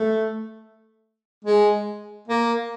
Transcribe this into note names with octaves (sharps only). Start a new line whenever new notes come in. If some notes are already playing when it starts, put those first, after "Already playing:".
Already playing: A3
G#3
A#3